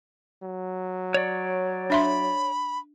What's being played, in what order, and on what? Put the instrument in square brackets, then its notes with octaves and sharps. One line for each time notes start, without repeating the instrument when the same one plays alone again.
[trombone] F#3
[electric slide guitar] C#5 D5
[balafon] D4 E5 C6 [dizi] B5